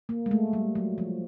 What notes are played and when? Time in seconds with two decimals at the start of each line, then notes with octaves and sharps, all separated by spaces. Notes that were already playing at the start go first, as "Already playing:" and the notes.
0.09 A#3
0.26 G#3
0.31 A3
0.53 G3
0.75 F#3
0.98 F3